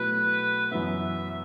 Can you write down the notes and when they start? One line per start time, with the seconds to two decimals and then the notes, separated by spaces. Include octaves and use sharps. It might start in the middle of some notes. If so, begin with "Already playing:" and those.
Already playing: B2 F#3 A3 E4 B4
0.71 F#2 E3 B3 E5